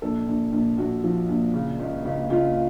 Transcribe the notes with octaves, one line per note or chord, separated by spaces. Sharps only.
A#1 A4
A#1
A#1
A#1 F#4
F3
A#1
C#3
C#2
C#2
C#2 F4